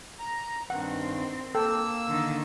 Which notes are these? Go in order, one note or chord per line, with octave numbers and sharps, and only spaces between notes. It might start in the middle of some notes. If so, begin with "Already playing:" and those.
A#5
G2 D#3 C4 F#5
A#3 A4 G5 E6
D3 D#3